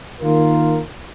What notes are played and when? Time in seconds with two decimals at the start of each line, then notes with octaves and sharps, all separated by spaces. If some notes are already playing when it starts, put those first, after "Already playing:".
0.20 D#3 A#3 F4 A#4